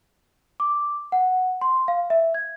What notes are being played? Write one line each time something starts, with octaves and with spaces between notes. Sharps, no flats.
D6
F#5
C6
F5
E5
G#6